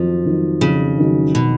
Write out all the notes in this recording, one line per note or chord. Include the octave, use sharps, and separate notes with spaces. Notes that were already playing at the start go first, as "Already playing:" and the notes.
Already playing: F2 D#3 F3 F#3
D#3 F#3
F2 C#3
D#3 F#3
B2